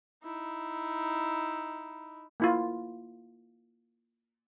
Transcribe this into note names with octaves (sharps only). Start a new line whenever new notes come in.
D#4 E4
A#3 E4 F4